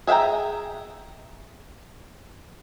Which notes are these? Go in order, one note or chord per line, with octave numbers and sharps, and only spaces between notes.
G#4 E5 F5 G5 A#5